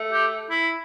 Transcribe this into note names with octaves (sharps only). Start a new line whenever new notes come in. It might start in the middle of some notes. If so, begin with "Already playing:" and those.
Already playing: A3
G4
E4